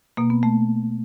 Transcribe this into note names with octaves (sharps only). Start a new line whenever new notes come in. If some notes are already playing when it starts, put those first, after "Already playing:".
B2 A#3
B3
A3